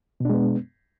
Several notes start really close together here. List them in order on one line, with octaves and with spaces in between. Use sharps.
B2 D4 G#3 B3